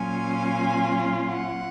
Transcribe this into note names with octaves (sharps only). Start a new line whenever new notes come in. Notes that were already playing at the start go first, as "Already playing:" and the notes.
Already playing: A#2 F#3 C#4 F4 G#5
F#5